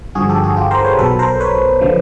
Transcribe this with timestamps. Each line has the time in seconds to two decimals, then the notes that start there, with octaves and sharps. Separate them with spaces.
0.15 G2 D3 F3 F#4 G#4
0.29 G4 A4
0.43 F#4 G#4
0.56 F4 G4
0.71 A#4 C5
0.85 B4 C#5
0.99 B1 B2 F#3 A4 B4
1.19 A#4 C5
1.40 B4 C#5
1.81 D3 F3